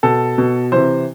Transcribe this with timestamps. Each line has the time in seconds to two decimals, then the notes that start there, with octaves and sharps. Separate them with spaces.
0.03 B2 A4
0.38 B2
0.72 C3 E3 C5